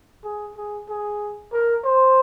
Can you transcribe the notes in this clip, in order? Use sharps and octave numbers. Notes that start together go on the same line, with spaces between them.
G#4
G#4
G#4
A#4
C5